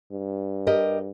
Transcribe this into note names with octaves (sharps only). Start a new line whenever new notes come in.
G2
G4 A#4 D#5